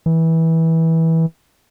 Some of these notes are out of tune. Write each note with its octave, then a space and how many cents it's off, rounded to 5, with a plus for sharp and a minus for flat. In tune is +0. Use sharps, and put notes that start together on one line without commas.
E3 -20